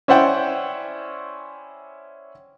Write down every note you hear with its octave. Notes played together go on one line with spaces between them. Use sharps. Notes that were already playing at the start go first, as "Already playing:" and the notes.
C#4 E4 C5 D5 F#5 G5